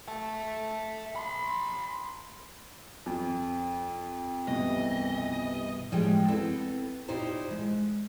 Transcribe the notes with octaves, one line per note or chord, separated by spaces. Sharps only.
E5 A5
B5 C6
F2
C2 G2 B2 E3 D#5
A2 F3 G3 G#3 G5
B3 C4 E4 A4
A#2 D#4 E4 G4 C5 A#5
G#3